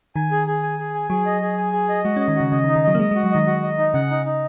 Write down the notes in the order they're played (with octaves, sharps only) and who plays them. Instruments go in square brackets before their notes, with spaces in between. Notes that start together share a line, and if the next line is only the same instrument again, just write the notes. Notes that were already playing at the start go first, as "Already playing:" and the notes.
[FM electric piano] D#3 [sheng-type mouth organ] G#5
[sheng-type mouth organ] G#4
G#4
G#5
G#4
G#5
[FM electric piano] F#3 [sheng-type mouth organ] G#4
[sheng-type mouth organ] D#5
G#4
G#5
G#4
D#5
[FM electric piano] G#3 [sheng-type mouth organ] F#4
[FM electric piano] C#4 [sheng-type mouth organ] D#5
[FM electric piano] D#3
[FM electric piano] C#3 [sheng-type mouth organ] F#4
[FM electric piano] C#3 [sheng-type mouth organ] D#5
[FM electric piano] D#3
[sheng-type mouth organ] D#4
[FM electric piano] D#3
[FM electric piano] F#3 [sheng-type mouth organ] D#5
[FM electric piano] A#3
[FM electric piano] G#3 [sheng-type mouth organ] D#5
[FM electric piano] G#3 [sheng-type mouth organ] F#4
[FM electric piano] F#3
[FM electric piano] D#3 [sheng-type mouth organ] D#5
[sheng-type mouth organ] F#4
D#5
D#4
[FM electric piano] C#3 [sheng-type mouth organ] F#5
[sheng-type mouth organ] D#4
D#4